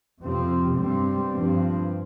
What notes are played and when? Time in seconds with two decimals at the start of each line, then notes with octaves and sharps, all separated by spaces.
0.21 F2 C3 F3 C4
0.77 G2 G3 C4
1.33 G2 F3 C4